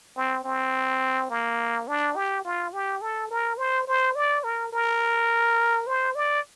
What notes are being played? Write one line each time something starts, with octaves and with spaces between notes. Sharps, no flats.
C4
C4
A#3
D4
G4
F4
G4
A4
A#4
C5
C5
D5
A#4
A#4
C5
D5